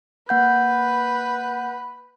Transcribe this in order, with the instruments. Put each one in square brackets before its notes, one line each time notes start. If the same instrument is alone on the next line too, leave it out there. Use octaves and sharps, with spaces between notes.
[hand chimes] A#3 F#5 G6 [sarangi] B4